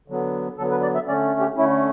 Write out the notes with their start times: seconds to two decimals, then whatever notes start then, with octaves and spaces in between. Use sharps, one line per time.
0.08 D3 F#3 B3
0.58 D3 F#3 B3 A4
0.71 B4
0.82 D5
0.95 E5
1.08 D3 A3 C#4 D5
1.40 G4
1.57 D3 A3 C#4 E4